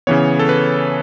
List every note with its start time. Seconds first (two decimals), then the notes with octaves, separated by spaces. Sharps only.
0.07 C#3 E3 B3 C#5
0.39 A4
0.49 B4